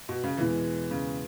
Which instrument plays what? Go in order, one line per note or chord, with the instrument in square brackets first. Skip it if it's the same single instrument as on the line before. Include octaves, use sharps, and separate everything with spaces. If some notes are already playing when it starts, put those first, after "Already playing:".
[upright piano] B2
C#3
[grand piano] E2 B2 G#3 B3 E4 [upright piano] E3
[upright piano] C#3